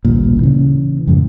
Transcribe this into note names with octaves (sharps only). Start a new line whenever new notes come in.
A1 D2 G2 A#2
C#3 E3
F2 G#2 C#3 E3